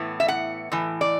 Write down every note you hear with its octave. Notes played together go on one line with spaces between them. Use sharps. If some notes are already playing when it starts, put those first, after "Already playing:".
Already playing: A2 E3 B3
E5
F#5
A2 E3
D5